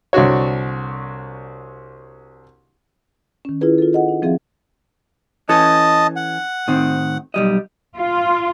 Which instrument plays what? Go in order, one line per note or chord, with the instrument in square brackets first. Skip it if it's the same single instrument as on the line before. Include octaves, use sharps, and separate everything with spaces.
[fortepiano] C2 D3 D4 F#4 C#5
[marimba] D#3 C#4
E4 F4 G#4 B4
F4 A4
G#4 D#5 F#5
D#4
F3 C4 G#4 E5 F5
[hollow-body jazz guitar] E3 C#4 A4 [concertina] D#5 A5
[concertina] F#5
[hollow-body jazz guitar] A2 D#3 C4
B1 G3 D#5
[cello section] F4